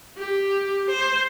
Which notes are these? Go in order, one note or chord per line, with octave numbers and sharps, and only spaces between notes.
G4
C5